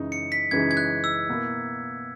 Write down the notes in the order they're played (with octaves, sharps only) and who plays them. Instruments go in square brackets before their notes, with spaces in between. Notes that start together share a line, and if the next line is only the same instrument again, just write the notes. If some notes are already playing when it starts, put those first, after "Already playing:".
Already playing: [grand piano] F#2 C#3 E3 G#3 D#4
[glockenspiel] C#7
B6
[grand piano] F#2 C#3 E3 G#3 D#4 [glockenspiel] G#6
[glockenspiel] G#6
F#6
E6
[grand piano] B2 A#3 E4 A#4